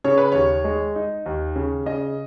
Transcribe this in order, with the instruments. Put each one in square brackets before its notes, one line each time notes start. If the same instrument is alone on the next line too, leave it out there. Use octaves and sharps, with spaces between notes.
[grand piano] C#3 [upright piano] C#5
[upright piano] B4
[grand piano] D#2 [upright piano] C#5
[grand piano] G#3
D#4
D#2
C#3
[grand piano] C#3 [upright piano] D#5